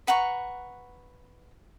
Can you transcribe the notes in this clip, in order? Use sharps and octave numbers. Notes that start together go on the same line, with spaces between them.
B4 F#5 A#5 C#6